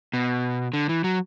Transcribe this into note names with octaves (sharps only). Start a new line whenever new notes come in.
B2
D3
E3
F#3